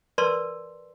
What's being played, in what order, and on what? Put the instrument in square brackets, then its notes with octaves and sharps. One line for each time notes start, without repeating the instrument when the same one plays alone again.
[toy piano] A#4 B4 D5 A5 C6 E6